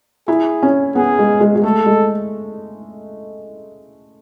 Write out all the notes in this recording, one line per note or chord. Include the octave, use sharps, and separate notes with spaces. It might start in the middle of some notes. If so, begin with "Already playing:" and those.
E4 G#4
C#4
B3 G#4
G#3
G#3
G#3
A3 A4
G#3